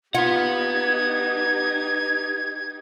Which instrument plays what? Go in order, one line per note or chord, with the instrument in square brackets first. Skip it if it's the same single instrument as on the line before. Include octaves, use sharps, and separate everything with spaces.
[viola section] D#4 G4 [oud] F4 [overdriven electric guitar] B4 F#5 [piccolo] G#6